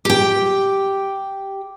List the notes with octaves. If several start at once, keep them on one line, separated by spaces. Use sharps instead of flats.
G4 G5